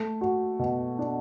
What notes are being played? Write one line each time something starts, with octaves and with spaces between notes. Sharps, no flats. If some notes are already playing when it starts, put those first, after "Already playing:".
Already playing: A3
F#4
B2
D4